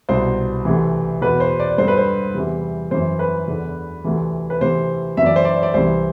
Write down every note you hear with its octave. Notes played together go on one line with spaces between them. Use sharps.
C2 B2 C5
D2 C3 E3
E2 B2 B4
C5
D5
G2 D3 C5
B4
C5
E2 C3 E3
F#2 E3 C5
B4
E2 D3
D2 C3 E3
B4
D2 C3 E3 C5
F#2 E3 E5
D5
C5
D5
D5
C2 C3 E3 C5